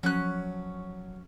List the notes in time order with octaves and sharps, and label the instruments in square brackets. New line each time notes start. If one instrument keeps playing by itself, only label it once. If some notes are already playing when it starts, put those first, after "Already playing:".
[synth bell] F3 [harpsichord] F#3 [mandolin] C#4 F#6